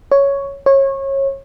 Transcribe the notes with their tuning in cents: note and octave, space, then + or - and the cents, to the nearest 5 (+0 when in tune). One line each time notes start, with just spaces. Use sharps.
C#5 +5
C#5 -25